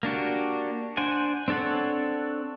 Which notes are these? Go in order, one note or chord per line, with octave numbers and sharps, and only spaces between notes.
A#3 D4 F#4 G4
D4 C5 D5 F#5 G#5
C4 D4 A4 C#5 F#5